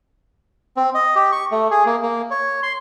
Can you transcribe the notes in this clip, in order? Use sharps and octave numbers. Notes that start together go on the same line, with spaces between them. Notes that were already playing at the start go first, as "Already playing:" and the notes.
C4
D#5
G4
C#6
A3
G#4
A#3
A#3
C#5
C6